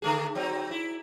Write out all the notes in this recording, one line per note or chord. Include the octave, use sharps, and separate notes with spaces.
D3 A3 G#4
F#3 C4 D#4
E4